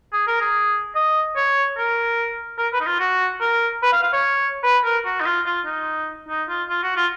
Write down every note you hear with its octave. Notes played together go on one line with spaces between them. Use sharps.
G#4
A#4
G#4
D#5
C#5
A#4
A#4
B4
D#4
F4
F#4
A#4
B4
F5
F5
C#5
B4
A#4
F#4
D#4
F4
F4
D#4
D#4
F4
F4
F#4
F4